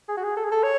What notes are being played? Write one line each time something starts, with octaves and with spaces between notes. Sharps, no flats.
G#4
F#4
G#4
A4
G#4
A4
C#5